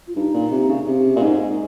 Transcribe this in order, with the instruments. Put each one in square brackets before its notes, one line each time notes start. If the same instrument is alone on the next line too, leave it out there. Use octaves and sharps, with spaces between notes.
[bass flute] F4
[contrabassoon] G2 [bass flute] D#4
[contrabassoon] A#2
C3
C#3
[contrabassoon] C3 [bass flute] C#4
[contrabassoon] A#2
[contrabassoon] G#2 [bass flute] D#4